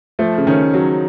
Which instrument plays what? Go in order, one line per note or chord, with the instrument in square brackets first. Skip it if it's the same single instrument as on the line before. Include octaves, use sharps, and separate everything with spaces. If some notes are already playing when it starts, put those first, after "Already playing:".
[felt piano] F3 [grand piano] A3
[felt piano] C#3
[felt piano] D#3 [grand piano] C#4
[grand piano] F#3